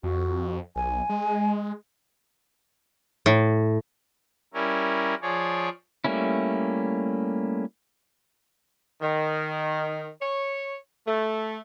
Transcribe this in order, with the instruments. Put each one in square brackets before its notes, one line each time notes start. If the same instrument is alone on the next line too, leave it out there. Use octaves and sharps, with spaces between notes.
[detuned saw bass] F2 [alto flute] F#4
[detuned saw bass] B1 [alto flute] G#5
[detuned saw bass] G#3
[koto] A2
[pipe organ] G3 C#4 E4 A#4
F3 G#4 C#5 D5
[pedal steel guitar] G3 A3 A#3 C#4 E4
[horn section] D#3
C#5
A3